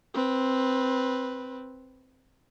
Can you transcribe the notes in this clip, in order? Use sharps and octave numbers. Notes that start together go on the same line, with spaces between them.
C4 B4